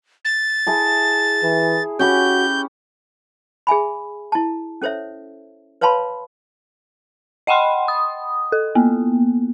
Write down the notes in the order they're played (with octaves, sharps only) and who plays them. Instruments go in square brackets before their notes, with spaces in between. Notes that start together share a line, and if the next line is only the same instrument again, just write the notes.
[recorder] A6
[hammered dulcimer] E4 G#4 A5
[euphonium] E3
[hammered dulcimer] C#4 G4 B4 [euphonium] F#4 [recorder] G6
[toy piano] G#4 E5 G#5 B5
E4 A5
C#4 A4 C5 C#5 E5
B4 C#5 F5 A5 B5 C6
[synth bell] D#5 F#5 G5 B5 C6
D#6
A4
A#3 B3